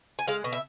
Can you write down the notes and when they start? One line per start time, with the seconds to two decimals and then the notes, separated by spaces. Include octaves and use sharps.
0.19 G#5
0.28 G#3 F5
0.44 B2
0.52 E5